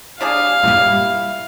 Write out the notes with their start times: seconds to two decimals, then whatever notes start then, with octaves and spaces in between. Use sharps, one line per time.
0.21 G3 D4 G#4 F5
0.63 G2 A#2 G3 E4